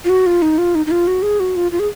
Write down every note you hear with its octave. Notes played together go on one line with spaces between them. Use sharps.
F4
F#4
F4
D#4
F4
D#4
D#4
F4
F#4
G#4
F#4
F4
F4
G#4